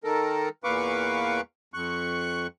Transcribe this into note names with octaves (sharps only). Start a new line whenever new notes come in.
D#3 A4 A#4
E2 A#2 B4 F5 C#6 D6
F2 C#6 F#6